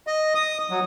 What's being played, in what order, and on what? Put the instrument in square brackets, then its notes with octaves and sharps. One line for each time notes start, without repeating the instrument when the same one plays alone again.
[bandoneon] D#5
D#6
F#3